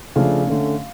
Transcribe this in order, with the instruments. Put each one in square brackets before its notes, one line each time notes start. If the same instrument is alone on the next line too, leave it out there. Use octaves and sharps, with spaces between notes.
[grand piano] C#3 F3 A3 D4 F5
D3 A3 C#4